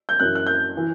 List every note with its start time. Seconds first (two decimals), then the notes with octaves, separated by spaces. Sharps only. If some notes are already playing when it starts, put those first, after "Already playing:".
0.09 G6
0.20 F#2 E3 F#6
0.35 F#6
0.47 G6
0.77 E3